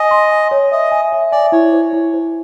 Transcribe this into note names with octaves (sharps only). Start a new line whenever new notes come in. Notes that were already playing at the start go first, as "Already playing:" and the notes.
Already playing: D#5 G#5
C6
G#5
C#5
D#5 E5
G#5
E5
D5 G#5
E4 C#5
C5
E4
C5